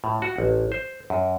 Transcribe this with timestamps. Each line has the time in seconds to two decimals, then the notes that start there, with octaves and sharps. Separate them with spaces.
0.04 A2
0.22 F#4
0.38 A1
0.72 C5
1.10 F#2